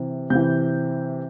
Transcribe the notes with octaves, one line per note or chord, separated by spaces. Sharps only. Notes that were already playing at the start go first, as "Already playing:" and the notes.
Already playing: C3 E3
C3 E3 G6